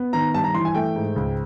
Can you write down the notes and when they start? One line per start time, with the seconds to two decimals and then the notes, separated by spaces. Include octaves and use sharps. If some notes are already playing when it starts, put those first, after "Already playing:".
Already playing: B3
0.13 D#3 A#5
0.34 G2 A5
0.44 A#5
0.54 E3 C6
0.65 G#5
0.75 A3 G5
0.95 G#2
1.16 C#2